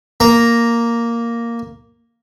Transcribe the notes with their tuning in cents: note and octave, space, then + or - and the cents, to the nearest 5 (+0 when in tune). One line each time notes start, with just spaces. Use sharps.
A#3 +0 A#5 +0